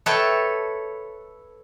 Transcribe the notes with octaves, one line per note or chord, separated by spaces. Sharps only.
A4 B4 C#5 E5 G5 A5